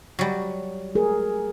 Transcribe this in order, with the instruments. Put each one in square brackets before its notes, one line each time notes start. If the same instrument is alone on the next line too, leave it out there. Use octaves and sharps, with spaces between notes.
[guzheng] F#3 G3
[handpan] A3 G#4 A#4